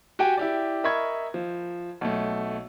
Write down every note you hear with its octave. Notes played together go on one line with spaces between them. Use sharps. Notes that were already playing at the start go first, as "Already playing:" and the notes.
F#4 G4 G5 G#5
E4 G4 D5
A#4 D#5 E5 B5 C#6 G#6
F3
B1 A3